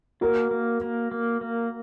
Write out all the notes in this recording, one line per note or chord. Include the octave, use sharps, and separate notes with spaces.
A#3 F#4 A#4
A#3
A#3
A#3
A#3